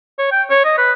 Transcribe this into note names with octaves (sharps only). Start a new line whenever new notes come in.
C#5
G5
C#5
D#5
B4